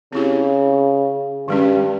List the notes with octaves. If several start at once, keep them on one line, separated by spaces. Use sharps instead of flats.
C#3 C4 E4 G4
G2 D#3 G#3 C#4